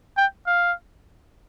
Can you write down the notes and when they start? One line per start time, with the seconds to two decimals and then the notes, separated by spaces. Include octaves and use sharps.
0.17 G5
0.47 F5